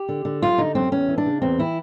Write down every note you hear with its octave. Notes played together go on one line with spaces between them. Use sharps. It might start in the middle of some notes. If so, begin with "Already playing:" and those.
Already playing: G4
D3
D3
F#2 F4
D3 D#4
F#2 C4
E2 C#4
E3
D4
C#3
E2 C4
E3 E4